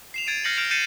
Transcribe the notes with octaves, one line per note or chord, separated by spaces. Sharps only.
C7 E7 F7
G#6 A6 D7 D#7
F6 G6 A#6 C7 C#7 F#7
F6 G6 A#6 D7 E7 F7
G6 A6 C7 C#7 D#7 E7